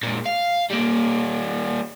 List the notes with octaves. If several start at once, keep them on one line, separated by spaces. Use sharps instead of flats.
A#2 G#3
F5
G3 A#3